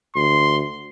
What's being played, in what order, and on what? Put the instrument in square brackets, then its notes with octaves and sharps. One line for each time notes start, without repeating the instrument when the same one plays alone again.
[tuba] D2 [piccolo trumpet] C6